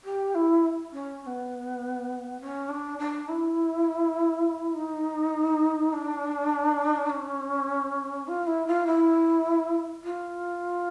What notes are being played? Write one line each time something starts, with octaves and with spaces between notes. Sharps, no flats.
G4
E4
C#4
C#4
B3
C#4
D4
D4
E4
D#4
D4
C#4
F4
E4
F4
E4
F4